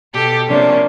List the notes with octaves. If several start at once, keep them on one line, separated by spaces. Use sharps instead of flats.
B2 G4 A4
C3 F3 A#3 C#4 D4